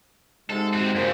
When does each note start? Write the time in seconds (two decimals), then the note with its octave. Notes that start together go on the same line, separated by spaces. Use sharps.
0.50 G#2 C3 G#3 A4
0.73 C4 F#4
0.96 G2 C#3 F3 A#3 C5